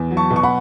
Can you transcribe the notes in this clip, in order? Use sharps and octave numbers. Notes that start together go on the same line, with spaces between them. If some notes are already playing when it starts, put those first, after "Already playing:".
Already playing: E2
F#3
A5 C#6
B2
C#6
F#5 B5